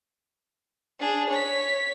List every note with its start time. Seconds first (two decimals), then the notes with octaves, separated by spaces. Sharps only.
1.00 D4 G#4
1.30 C#5 B6